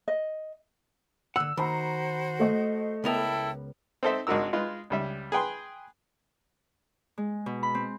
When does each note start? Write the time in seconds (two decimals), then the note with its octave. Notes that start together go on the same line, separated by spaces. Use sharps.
0.08 D#5
1.36 D3 F#5 E6
1.57 D#3 F#4 C5 A#5 B5
2.39 A3 D#5
3.04 C#2 B3 E4 A4 A#4 G5
4.03 C4 D#4 A4 C5 E5
4.27 G#1 G#3 D4 F#4 A#4 E6
4.53 G#3 F4 B4
4.90 C#2 G3 E5
5.32 G#4 B4 G5 C6
7.18 G#3
7.46 B2
7.63 B5
7.75 C4